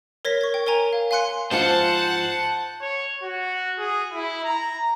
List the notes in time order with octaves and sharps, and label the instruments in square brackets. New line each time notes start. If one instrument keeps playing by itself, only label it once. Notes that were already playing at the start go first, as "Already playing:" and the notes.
[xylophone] A#4 C#5 A#6 B6
C#6 G#6
G5
A#4 C#5 G#5 A#5
F5
F5 G#5 C6 F#6 C#7
[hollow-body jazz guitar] G#2 F3 F4 [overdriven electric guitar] C5 [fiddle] F#5 [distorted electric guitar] A5
[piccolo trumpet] C#5
F#4
G#4
E4
A#5